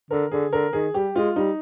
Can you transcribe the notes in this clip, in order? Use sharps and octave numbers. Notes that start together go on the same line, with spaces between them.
D3 A#4
D3 G#4
D3 A#4
D#3 G#4
G3 G4
G#3 F4
G3 D#4